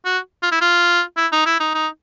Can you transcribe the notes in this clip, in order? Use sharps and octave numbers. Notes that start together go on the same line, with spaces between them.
F#4
F4
E4
F4
E4
D#4
E4
D#4
D#4